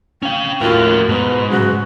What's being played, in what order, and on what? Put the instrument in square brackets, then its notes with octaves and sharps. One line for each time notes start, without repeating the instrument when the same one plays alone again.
[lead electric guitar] C#4 F5 [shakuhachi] G5
[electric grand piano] D#2 A2 [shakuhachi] F4 [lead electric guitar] F#4 A#4
[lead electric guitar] G#2 [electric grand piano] B2 [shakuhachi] B4
[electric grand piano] C#3 F#3 G#3 [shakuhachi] F#4